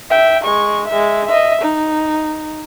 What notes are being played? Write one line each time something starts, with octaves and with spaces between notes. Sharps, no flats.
E5 G5
G#3 C#6
G#3 E5
D#5 E5
D#4